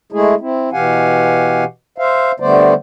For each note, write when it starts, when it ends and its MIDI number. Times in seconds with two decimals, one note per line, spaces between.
0.12 0.35 56
0.12 0.35 57
0.12 0.35 64
0.12 0.35 68
0.41 0.70 60
0.41 0.70 64
0.73 1.64 47
0.73 1.64 52
0.73 1.64 67
0.73 1.64 77
0.73 1.64 78
0.73 1.64 80
1.98 2.32 72
1.98 2.32 76
1.98 2.32 77
2.40 2.74 50
2.40 2.74 55
2.40 2.74 57
2.40 2.74 59
2.40 2.74 72
2.40 2.74 74